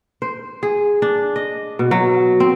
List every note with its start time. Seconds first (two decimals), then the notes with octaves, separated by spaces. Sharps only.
0.22 C5
0.63 G#4
1.02 D4
1.36 D#5
1.79 B2
1.91 F#3
2.40 C4